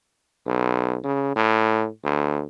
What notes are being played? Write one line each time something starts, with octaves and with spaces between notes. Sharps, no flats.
B1
C#3
A2
D2